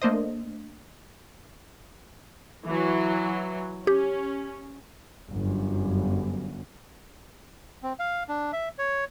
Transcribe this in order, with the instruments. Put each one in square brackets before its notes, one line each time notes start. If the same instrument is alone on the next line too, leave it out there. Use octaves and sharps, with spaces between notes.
[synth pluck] A3 A#3 D4 C5 D#5
[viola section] E3 F#3
[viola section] C#4 [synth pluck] G4
[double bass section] G1 F#2
[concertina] C4
F5
D4
E5
C#5